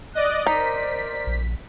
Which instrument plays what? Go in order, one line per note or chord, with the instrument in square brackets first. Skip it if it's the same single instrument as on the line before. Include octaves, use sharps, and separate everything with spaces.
[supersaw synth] D5 D#5 [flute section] F#6
[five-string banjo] D#4 [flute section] A#4 C5 D5 [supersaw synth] B6
[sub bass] A#1